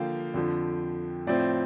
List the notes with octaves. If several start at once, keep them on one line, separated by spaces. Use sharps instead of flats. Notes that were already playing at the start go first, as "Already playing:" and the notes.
Already playing: D3 F3 A#3 F5 G5
F2 D3 F3
A2 F3 C4 D5